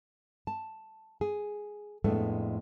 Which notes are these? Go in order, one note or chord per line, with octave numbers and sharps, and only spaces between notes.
A5
G#4
F2 A2 G#3 A3 B3 D4